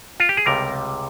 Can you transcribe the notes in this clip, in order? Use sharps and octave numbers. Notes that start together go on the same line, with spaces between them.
F4
G4
G#4
C#2 C3 G3 A#4